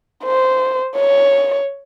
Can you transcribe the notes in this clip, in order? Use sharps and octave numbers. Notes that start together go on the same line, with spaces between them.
C5
C#5